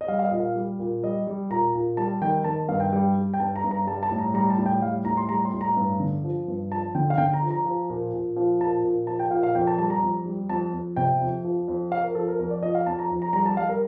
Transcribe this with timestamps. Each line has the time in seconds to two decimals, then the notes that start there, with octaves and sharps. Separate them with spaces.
0.01 D#5
0.08 G3 F5
0.19 F5
0.25 D#5
0.31 A#2
0.40 F5
0.56 G3
0.79 A#2
1.03 G3 D#5
1.27 G3
1.51 A#2 A#5
1.74 A#2
1.97 G3 A5
2.22 D#3 G5
2.44 D#3 A5
2.69 G2 F5
2.80 G5
2.93 G3 G5
3.16 G3
3.34 G5
3.40 G2 A5
3.56 A#5
3.64 G2
3.71 A#5
3.87 G3 A5
4.03 A5
4.11 A2
4.18 A#5
4.34 G3 A#5
4.50 A5
4.58 A2
4.66 G5
4.82 G3 F5
5.05 A2 A#5
5.17 C6
5.29 G3 A#5
5.45 C6
5.53 A2
5.61 A#5
5.77 G2
6.00 D3
6.24 F3
6.48 G2
6.71 F3 A5
6.95 D3 G5
7.10 F5
7.18 D3 G5
7.34 A#5
7.43 F3
7.50 A#5
7.66 F3
7.90 A#2
8.14 A#2
8.36 F3
8.60 A#2 A5
8.84 A#2
9.07 F3 A5
9.19 G5
9.31 A#2 F5
9.43 F5
9.55 F2 G5
9.67 A5
9.78 G3 A5
9.90 A#5
10.02 F2
10.26 G3
10.49 F2 A5
10.73 F2
10.96 C3 G5
11.21 F2
11.45 F3
11.68 F2
11.92 F3 F5
12.03 A#4
12.15 F3 A4
12.28 A#4
12.39 F2 A#4
12.50 D5
12.63 F3 D#5
12.75 F5
12.86 F2 A5
12.99 A#5
13.10 F2
13.22 A#5
13.33 G3 A#5
13.46 A5
13.57 G3 F5
13.69 A#4